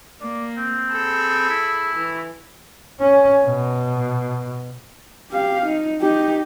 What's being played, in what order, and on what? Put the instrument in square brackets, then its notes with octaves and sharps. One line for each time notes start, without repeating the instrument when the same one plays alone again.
[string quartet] A#3 [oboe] D5
[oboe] C4
[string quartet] G#4 A4 B5
[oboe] E4
[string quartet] E3
[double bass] C#4
B2
[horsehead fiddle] G4 F5
D#4
D#4 G4